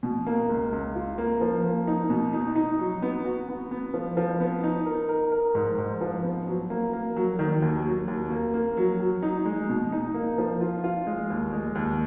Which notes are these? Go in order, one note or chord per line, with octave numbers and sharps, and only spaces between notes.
B2
A#3
C#2
C#2
F4
A#3
F3
A#3
D#4
B2
D#4
D#4
F#3
B3
F#4
B3
B3
F3
F3
B3
D#4
A#4
A#4
A#4
G#2
G#2
F3
B3
F#3
A#3
A#3
F#3
D#3
D#2
F#3
D#2
A#3
A#3
F#3
F#3
D#4
G#3
B2
D#4
A#3
F3
F4
F4
G#3
D#2
G#3
D#2